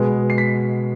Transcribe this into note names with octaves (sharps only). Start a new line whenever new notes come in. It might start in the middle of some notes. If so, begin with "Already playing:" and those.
Already playing: B2 G#3 B3
C7
B6